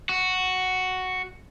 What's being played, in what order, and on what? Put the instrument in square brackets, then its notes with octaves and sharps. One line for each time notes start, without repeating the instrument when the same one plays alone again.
[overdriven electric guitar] F#4